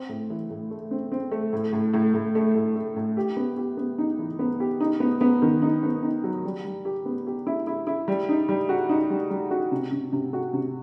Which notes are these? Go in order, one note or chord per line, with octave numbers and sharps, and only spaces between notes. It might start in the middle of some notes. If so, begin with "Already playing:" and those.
Already playing: C4
A2
E3
A2
A3
C4
C4
A3
A2
A2
A2
A2
A3
A2
A3
A2
G4
B3
G4
B3
D#4
E3
B3
G4
D#4
B3
B3
D#3
D#4
B3
D#4
F#3
G3
G3
G4
B3
G4
E4
E4
E4
G3
D#4
G3
F#4
D#4
G3
G3
F#4
C3
C3
C3
F#4
C3